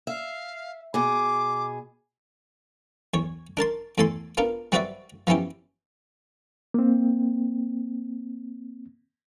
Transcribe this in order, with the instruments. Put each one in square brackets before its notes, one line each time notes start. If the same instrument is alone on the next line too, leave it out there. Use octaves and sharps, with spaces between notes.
[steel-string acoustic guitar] E5 [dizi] F5
[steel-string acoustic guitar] B2 G#4 [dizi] D6
[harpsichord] E2 C#5
D4 A#4 A5 C6
E2 A2 A4 G#5 C6
B3 D4 F4 A#4
G3 C4 F#4 B4 D5 E5
F3 B3 C#4 E4 G4
[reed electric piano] A#3 C4